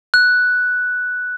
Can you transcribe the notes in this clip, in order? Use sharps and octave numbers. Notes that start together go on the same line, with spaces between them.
F#6